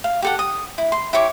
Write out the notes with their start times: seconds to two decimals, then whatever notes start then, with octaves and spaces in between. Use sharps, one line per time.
0.04 F5
0.22 G4 A4 F#5
0.39 D#6
0.78 E4
0.92 C6
1.13 E4 G4 C#5 D6